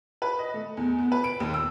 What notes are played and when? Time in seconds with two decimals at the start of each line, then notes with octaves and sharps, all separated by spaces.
0.22 B4
0.39 D#5
0.54 A3
0.77 E2
0.99 B3
1.12 B4
1.24 D7
1.40 D#2
1.54 E6